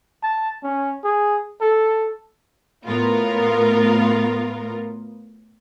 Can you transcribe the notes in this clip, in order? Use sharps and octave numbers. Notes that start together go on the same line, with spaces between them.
A5
C#4
G#4
A4
A2 B3 F4 A#4